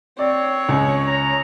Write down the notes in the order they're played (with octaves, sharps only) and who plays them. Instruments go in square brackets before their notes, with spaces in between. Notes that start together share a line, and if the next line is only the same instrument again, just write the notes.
[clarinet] C4 [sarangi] C#5 [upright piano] D5
[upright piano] C#2
[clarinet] A#5